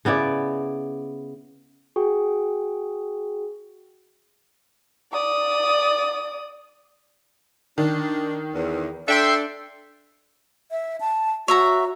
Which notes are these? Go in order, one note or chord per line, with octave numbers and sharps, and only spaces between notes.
C#3 B3 E4 D5
F#4 G#4 G5
D5 D#6
D#3 D4
E2
D4 A4 E5 G5 C6
E5
A5
F#4 C#5 E5 A#5